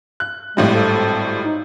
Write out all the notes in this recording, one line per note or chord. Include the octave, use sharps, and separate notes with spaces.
F#6
G#1 A2 G3 G#3
A4
D#4